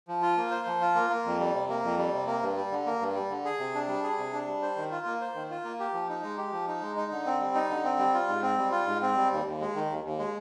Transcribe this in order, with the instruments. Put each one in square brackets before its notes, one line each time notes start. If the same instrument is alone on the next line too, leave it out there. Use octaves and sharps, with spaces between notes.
[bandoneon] F3
F4
A#3
C5
F3
F4
A#3
A#3
F2
G3
C3
A#3
F2
G3
C3
A#3
G2
G3
D3
A#3
G2
G3
D3
G#4
C3
D4
G3
G#4
C3
D4
G3
C5
D#3
F4
A#3
C5
D#3
F4
A#3
G4
F3
D#4
G#3
G4
F3
D#4
G#3
D#4
D3
C4
G3
D#4
D3
C4
G3
F4
G#2
C4
G3
F4
G#2
C4
G3
D#2
D#2
G#3
D#3
D#2
D#2
G#3